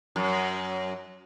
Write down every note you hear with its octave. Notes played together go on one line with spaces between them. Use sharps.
F#2